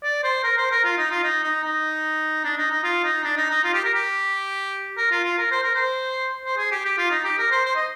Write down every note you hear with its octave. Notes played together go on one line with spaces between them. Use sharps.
D5
C5
A#4
C5
A#4
F4
D#4
F4
D#4
D#4
D#4
D4
D#4
D#4
F4
D#4
D4
D#4
D#4
F4
G4
A#4
G4
A#4
F4
F4
A#4
C5
A#4
C5
C5
G#4
G4
G4
F4
D#4
G4
A#4
C5
C5
D#5